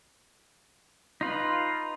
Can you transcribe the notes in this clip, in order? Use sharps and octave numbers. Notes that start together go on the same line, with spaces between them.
D#4 F4 B4